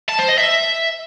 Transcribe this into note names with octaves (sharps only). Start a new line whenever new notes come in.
A5
C5
D#5
E5